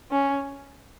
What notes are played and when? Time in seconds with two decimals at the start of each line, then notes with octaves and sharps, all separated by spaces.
0.11 C#4